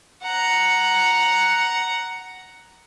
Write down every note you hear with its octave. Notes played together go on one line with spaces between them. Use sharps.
F#5 A#5